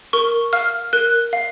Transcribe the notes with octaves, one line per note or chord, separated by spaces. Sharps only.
A#4 C#6
F5 F6
A#4 F#6
F5